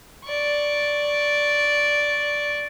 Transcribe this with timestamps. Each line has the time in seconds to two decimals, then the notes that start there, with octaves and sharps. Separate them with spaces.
0.25 D5 C#6